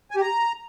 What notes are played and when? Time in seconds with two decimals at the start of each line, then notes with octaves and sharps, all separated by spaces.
0.11 G#5
0.16 G4
0.21 A#5